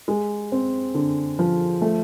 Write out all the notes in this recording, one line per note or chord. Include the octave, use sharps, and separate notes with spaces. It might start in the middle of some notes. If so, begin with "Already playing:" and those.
G#3
C4
D3
F3
A3